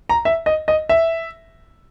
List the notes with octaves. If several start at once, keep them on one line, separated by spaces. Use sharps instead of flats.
A#5
E5
D#5
D#5
E5